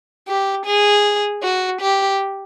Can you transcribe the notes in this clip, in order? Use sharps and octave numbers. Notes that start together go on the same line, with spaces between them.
G4
G#4
F#4
G4